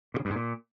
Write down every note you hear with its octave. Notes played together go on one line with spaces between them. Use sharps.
A#2
C#3
G2
G#2
A#2